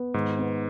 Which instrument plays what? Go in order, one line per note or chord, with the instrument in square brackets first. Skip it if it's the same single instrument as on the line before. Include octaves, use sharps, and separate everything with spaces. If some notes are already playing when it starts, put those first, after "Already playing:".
Already playing: [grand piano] B3
[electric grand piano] G#2 [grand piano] D#3
[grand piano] B3